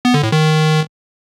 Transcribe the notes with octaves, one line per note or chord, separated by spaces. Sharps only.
B3
D3
A2
D#3